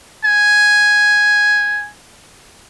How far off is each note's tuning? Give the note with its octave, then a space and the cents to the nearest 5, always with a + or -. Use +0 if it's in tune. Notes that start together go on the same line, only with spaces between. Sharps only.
G#5 +0